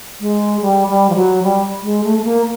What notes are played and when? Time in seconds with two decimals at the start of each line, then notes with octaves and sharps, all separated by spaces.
0.20 G#3
0.61 G3
0.88 G3
1.10 F3
1.16 F#3
1.43 G3
1.83 G#3
2.04 A3
2.19 A3
2.25 A#3